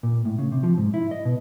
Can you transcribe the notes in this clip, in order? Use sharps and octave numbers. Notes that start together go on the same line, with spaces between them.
A#2
A2
C#3
C3
F3
G#2
E4
D#5
B2